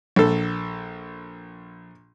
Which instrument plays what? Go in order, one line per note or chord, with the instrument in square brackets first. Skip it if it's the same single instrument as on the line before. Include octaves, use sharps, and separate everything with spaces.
[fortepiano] A#1 A4